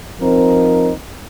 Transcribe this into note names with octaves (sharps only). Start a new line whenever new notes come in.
F3 C4 D#4 A#4